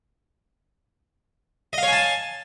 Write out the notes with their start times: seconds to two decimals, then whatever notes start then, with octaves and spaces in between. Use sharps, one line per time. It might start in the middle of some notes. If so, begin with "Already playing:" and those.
1.73 D#5
1.78 F5
1.83 C#5
1.88 G#5
1.93 A5